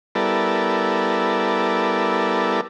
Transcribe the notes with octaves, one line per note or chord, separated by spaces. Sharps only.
G3 B3 E4 A4 A#4 D5